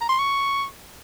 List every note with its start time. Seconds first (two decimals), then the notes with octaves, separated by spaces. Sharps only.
0.01 A#5
0.09 C6
0.19 C#6